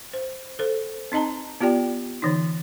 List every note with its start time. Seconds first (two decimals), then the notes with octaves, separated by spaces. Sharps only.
0.13 C5
0.59 A4 C5
1.12 C4 D#4 D#5 A5 A#5
1.60 B3 F4 G4 D5 G5
2.22 D3 E3 D#4